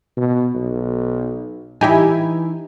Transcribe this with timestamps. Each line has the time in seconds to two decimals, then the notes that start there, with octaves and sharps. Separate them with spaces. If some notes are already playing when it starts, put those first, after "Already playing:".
0.17 B2
0.55 B1
1.81 E3 D#4 E4 G4 G#5